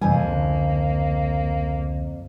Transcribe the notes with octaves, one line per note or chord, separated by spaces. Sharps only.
F2 C3 E3 G3 A#3 G#5
C#2 D3